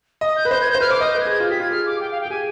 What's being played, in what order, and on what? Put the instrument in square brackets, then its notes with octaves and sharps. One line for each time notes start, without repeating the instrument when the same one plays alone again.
[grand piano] D#5 [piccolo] D#6
[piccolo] G6
[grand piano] B4
[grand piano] C5 [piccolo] G6
[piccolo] G#6
G6
[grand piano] C5
[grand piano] B4 [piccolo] F6
[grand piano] C5 [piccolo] D6
[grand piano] D#5 [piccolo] D#6
[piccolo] G6
[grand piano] B4
[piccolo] G#6
[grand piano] G#4
[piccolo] G#6
[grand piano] F4
[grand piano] G4 [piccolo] B6
[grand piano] F4 [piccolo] G#6
[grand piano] G#4 [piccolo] F6
[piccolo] D6
G5
F5
G5
[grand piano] G#4
[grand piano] G4 [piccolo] G#5